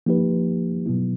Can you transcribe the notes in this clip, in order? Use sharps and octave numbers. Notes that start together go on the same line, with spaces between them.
F3 A#3 D#4 G4 B4
B2 F#3 B3 E4